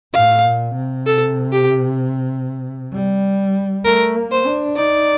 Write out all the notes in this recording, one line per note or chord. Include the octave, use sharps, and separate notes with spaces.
A2 F5
A#2
C3
A4
G4
G3
A3 A#4
A#3
C5
D4
D#4 D5